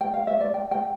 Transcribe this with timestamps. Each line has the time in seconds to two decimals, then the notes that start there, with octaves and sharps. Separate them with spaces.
0.01 G5
0.14 F5
0.27 E5
0.41 D5
0.54 G5
0.71 G5